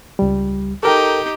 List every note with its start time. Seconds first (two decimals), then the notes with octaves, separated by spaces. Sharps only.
0.19 C#2 G3
0.83 D#4 G4 A4 A#4 G5